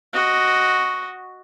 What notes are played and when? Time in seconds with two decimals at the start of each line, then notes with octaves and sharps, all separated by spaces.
0.13 F#4 D#5